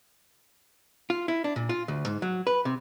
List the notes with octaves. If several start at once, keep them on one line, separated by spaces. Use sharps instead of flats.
F4
E4
D4
A#2
F4
D2
G#2
F#3
B4
C3